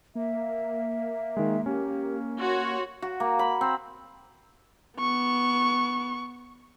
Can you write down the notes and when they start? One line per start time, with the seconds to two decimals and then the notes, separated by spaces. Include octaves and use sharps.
0.15 A#3 E5
1.37 D#3 G#3
1.66 C#4 G4
2.39 F#4 C#5 C6
3.02 F#4
3.20 A#3
3.39 B5
3.61 C4
4.98 B3 C#6